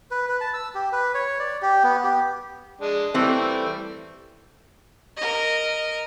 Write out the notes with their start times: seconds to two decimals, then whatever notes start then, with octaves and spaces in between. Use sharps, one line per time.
0.11 B4
0.29 B4
0.41 A5
0.54 E6
0.75 G4
0.93 B4
1.14 C#5
1.39 D5
1.62 G4
1.84 B3
2.04 G4
2.81 G#3 D4
3.14 E3 G3 A3 C4
5.17 A#4 D#5